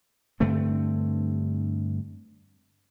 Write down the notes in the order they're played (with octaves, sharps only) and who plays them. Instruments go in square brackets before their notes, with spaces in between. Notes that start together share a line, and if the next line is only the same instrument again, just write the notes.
[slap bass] G2 D3 A3 C4